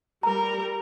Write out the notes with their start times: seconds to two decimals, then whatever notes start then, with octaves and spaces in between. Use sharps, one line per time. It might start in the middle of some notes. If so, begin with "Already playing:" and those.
0.23 G3 A#4 A#5